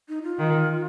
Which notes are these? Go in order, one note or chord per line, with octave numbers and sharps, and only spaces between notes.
D#4
F4
D#3